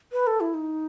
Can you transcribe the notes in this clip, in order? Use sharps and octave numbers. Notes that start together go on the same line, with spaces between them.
B4
A4
E4
D#4